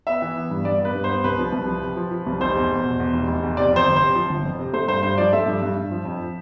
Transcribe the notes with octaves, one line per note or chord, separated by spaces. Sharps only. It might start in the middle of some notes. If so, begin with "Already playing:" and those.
B3 E5
E3
B3
G2
G2 D5
B3 B4
G2
B3 C5
C2 B4
F3
C2
F3
C3
F3
F3
C2
F1 C5
E2
E2
B2
E2
F1
F1
E2
C3 D5
F2 C5
G1
C3 C5
F3
G1
F2
C3
A3 C5
G2 C5
G2 C5
F3 D5
A3 E5
G2
G2
G2
F3
F2